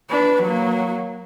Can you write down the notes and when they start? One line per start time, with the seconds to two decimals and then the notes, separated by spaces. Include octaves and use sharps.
0.11 D4 B4
0.43 F#3 A#3